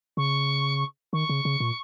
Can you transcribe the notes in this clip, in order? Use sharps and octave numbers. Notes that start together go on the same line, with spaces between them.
C#3 C#6
D#3 C#6
C#3
C#3
A#2